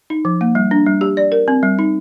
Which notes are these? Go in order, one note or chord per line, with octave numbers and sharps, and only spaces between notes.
D#4
F3
A#3
G3
D4
G3
G4
D5
A#4
C4
G3
D#4